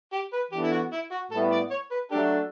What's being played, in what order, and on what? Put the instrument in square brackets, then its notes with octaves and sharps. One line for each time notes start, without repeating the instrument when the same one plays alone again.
[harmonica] G4
B4
[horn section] E3 B3 D4 A4 [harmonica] G4
[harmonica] E4
F#4
E4
F#4
[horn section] A2 G3 B3 E4 [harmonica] A4
[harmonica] D5
C#5
B4
[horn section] F#3 A3 D4 A4 [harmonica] G4